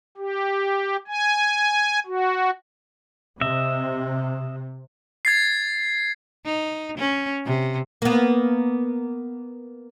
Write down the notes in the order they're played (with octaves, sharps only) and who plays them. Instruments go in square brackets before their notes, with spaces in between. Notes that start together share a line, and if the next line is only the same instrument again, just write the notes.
[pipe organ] G4
G#5
F#4
[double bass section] C3 [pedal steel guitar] D#5 E5
[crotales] G#6 A6 C7
[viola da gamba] D#4
C#4
C3
[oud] A#3 B3